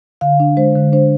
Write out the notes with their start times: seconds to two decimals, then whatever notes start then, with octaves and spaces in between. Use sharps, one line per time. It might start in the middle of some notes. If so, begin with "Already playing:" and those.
0.21 D3 F5
0.40 D4
0.57 G#3 C5
0.76 D3
0.93 D4 C5